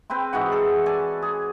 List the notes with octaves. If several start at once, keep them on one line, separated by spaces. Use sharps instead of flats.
C4 B4 G5 C6
G#2 E3 F#4 F#5
A4
A4 D5 G#5
G#4